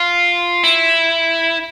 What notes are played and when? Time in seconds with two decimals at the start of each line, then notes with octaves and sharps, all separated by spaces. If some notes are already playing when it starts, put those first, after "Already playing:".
Already playing: F4
0.64 E4